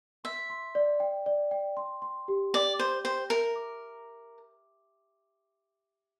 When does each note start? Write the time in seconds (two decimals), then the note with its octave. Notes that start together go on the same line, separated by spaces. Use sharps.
0.24 E5 C6
0.50 C6
0.75 D5
1.00 G5
1.26 D5
1.51 G5
1.77 C6
2.02 C6
2.28 G4
2.54 D5 G5
2.79 C5 C6
3.04 C5 G5
3.30 A#4 E5
3.56 D6